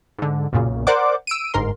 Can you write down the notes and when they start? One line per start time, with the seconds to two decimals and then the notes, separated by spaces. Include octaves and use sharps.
0.18 G#2 D3
0.52 B1 F#2 A#2 C#3
0.87 A#4 C5 D5 F#5 D6
1.27 E6 D7 D#7
1.54 G1 G#2 A#4 C6